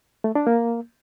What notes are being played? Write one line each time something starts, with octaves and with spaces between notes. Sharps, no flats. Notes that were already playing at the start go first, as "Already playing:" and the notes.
A3
D4
A#3